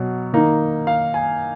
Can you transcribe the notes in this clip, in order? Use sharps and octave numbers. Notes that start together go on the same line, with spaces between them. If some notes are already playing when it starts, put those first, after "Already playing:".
Already playing: B2 F#3
D#3 A#3 D#4
F5
G#5